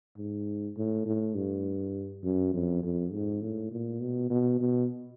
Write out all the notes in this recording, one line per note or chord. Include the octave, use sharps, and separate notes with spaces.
G#2
A2
A2
G2
F#2
F2
F2
G#2
A2
A#2
B2
B2
B2